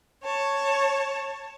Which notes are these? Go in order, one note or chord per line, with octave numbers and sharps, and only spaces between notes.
C#5 A5